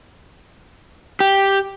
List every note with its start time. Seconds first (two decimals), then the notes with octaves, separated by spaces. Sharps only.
1.20 G4